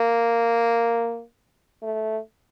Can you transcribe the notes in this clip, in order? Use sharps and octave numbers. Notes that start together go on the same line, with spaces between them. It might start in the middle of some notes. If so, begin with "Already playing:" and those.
Already playing: A#3
A3